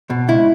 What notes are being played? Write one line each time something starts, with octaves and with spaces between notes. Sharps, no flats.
B2
C#2 E4